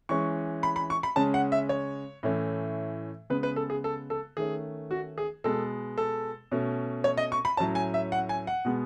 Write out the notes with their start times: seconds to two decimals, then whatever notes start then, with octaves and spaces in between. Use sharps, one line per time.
0.09 E3 G#3 C#4 C#6
0.63 B5
0.76 B5
0.90 C#6
1.03 B5
1.16 C#3 G#3 C#4 A5
1.34 F#5
1.52 E5
1.69 C#5
2.23 A2 E3 A3 C#4
3.30 C#3 G#3 B3 B4
3.43 B4
3.56 A4
3.70 G#4
3.84 A4
4.10 A4
4.37 D#3 A3 C#4 G#4
4.91 F#4
5.18 G#4
5.44 B2 G#3 B3 A4
5.98 A4
6.51 B2 A3 C#4
7.04 C#5
7.17 D#5
7.32 C#6
7.45 B5
7.57 A2 F#3 C#4 A5
7.75 G#5
7.94 E5
8.12 F#5
8.29 G#5
8.47 F#5
8.65 B2 G#3 B3